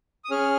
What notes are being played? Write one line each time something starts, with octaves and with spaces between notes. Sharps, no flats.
D#6
C#4 G#4 F6